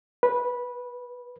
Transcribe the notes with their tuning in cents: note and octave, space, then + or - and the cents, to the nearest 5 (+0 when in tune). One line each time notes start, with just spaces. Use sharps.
B4 -15